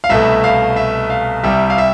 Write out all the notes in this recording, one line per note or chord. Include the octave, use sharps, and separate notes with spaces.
F5
C2 B2 A3 E5
F5
E5
F5
C2 C3 G3 E5
F5
E5